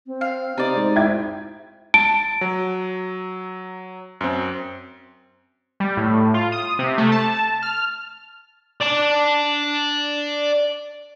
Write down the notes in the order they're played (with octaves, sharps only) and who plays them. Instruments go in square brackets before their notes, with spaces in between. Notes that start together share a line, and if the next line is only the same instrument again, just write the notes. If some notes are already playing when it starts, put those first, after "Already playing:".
[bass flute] C4
[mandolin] F5
[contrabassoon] C3 [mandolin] D#4 D5 [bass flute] C5
[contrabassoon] G#2
[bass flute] E4 [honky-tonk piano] E5 G5 G#6
[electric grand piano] A5 [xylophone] D7
[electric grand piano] F#3
F#2 C4
[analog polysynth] G3
A2
F4
D#6
C3
A3
A5
F6
[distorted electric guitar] D5 A5